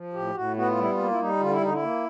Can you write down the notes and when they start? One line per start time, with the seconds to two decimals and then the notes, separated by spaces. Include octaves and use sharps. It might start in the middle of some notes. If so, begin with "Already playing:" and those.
Already playing: F3
0.13 A2 G4
0.35 A2 F#4
0.56 B3 F#4
0.68 F4
0.77 G3 E4
0.91 F4
0.98 A#3
1.11 E4
1.19 G3 D#4
1.40 D3 F4
1.51 E4
1.61 D3 D#4
1.73 E4
1.82 A#3